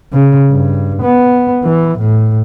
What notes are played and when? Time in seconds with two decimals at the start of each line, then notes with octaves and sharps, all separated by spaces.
0.13 C#3
0.51 G2
1.02 B3
1.64 E3
1.99 A2